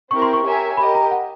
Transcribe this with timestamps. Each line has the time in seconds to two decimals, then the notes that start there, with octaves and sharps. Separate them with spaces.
0.10 C4 E4 G4 A#4 C#6
0.22 C6
0.33 C#6
0.44 G4 A#4 C#5 E5 G#5
0.77 G4 A#4 D#5 B5
0.94 A#5
1.11 F#5